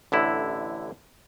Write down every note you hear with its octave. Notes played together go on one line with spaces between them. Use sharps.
A1 D3 E4